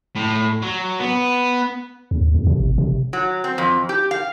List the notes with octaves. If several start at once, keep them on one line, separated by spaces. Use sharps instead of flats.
A2
F#3
B3
D#2
E2
C3
G#1
C3
F#3
C4
F2
G4
F5